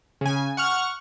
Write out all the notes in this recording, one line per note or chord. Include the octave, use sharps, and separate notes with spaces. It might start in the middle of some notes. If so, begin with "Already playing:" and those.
C#3 G#5
F#5 C#6 F6